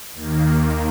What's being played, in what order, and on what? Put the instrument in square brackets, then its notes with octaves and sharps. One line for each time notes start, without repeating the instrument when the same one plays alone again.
[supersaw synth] D#2 D#3 A#3